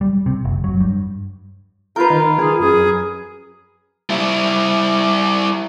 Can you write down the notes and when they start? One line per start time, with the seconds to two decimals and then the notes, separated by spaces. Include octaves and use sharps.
0.01 G3
0.26 C3
0.45 F#1
0.64 F#3
0.80 G2
1.96 F4 A#4 B4 G6
2.10 D#3
2.39 G#4
2.60 F#2 G#4
4.10 G3 E4